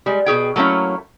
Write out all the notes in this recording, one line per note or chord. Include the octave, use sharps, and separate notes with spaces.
G3 G#3
B2 G4 G#4 G5
F#3 A3 A#3 C#4 E4